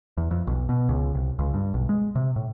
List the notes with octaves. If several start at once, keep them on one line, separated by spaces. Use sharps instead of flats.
E2
F2
B1
B2
C#2
C2
C#2
G2
B1
G#3
C3
A2